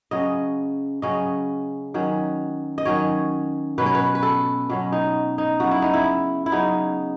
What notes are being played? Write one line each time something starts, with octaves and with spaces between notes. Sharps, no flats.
C#3 F#3 C#4 D#5
C#3 F#3 C#4 D#5
D#3 F#3 C#4
D#5
D#3 F#3 C#4 C#5
B2 F#3 C#4 B4
C#5
B4
B4
A4
B2 F#3 C#4
D#4
D#4
C#3 F#3 B3 F#4
E4
D#4
E4
E4
C#3 F#3 B3 D#4